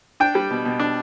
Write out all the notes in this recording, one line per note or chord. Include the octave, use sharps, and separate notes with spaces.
D4 G5
G3
B2
B2
D4